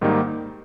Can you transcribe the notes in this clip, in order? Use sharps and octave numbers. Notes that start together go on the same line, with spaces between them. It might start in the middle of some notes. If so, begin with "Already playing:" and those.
G#2 D#3 G3 A#3 D#4